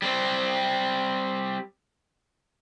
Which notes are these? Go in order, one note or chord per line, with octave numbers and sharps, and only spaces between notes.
G3 C4